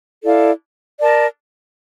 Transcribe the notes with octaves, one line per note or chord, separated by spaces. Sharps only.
E4 A4 D5 F5
A#4 D5 A5